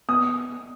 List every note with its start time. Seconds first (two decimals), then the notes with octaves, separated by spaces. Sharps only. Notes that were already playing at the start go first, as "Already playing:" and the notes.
0.09 B3 D#6